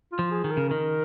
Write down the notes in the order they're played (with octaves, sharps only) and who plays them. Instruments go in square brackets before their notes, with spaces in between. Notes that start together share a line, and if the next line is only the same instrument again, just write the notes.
[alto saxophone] F4
[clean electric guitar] F3
[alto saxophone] G#4
[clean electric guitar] D#3
[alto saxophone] A#4
[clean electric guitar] C#3
[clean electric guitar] D#3 [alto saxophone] A#4